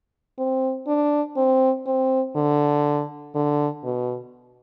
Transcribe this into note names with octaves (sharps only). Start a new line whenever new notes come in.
C4
D4
C4
C4
D3
D3
B2